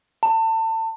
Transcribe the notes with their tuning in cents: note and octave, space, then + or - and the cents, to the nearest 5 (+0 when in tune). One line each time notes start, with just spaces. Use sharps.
A5 +30